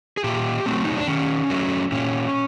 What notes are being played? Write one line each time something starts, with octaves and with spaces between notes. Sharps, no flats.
G#4
A#2 G4
F#3 A3 C4
D#4
D4
D#3 C#4
F#3 A3
A#2 C#4